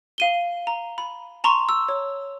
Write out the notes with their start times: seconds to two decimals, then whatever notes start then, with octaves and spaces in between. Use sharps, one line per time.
0.18 F5 D#7 G7
0.67 A#5
0.98 B5
1.44 A5 A#5 C6 C#6 F7
1.69 E6
1.89 C#5